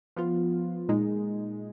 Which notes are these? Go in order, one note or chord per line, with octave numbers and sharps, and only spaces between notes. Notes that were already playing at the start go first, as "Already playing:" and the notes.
F3 B3 F4
A#2 G#3 D#4